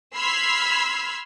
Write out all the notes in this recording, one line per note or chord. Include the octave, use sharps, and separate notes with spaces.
B5 C6 E6 F6 G#6 B6